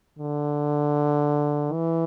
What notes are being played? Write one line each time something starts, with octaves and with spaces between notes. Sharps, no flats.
D3
E3